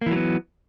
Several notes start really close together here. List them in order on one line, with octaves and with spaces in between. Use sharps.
A#3 E3 F#3 B3